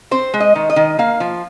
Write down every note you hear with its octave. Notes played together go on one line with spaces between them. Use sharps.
C4 C5
G#3
D#5
D#3
D#5
D#3
A#3 F5
F3